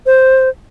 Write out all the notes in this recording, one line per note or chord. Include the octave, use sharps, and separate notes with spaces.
C5